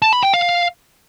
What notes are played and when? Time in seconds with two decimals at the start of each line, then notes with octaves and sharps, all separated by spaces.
0.02 A5
0.13 B5
0.23 G5
0.34 F5